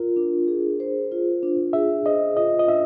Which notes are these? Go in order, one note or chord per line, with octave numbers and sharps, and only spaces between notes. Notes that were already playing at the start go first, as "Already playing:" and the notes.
Already playing: F4 A#4
D4
G#4
C5
F4
D4
G#4 E5
C5 D#5
F4 D#5
D#5
D4 E5